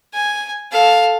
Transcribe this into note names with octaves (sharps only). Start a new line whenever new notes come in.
G#5
A4 F5